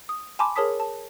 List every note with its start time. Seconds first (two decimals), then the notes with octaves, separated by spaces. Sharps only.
0.09 D#6
0.39 G#5 A5 B5 C6 D6
0.56 G#4 A#4 C#5 A5 D#6 B6
0.80 A5